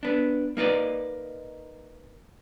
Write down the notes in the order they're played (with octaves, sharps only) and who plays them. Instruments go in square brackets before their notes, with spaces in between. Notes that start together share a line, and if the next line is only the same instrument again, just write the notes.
[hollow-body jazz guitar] B3 D4
A#3 D#4 B4 D5